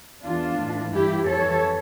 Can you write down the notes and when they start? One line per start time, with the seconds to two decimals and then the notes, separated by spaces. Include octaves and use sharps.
0.23 E2 E3 D4 F4
0.58 A2 E3
0.93 G2 E3 E4 G4
1.28 F2 E3 A4 C#5